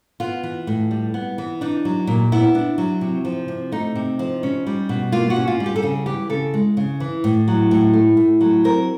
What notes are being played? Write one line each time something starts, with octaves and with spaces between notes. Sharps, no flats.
B3 F4
E3
A2
G3
B3
E3
D4 D#4
F#3
A#2
B3 E4
D4
F#3
C3
F3
C3
A3 D#4
C3
F3
C#4
G3
B2
A#3 F4
F#4
C#4
F4
G3
G4
A4
C#3 G#4
E3 G4
C#3 A4
G#3
C#3
E3
A2
F#3
A2
A3
A2
F#3
C4 A#4